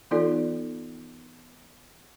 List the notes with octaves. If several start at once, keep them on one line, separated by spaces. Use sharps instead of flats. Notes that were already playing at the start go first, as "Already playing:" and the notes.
E3 B3 D#4 F4 A4 D5